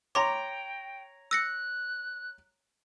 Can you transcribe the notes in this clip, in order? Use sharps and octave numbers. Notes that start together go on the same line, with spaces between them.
C#5 G5 A#5 C6 D6
E6 F#6 A#6 C#7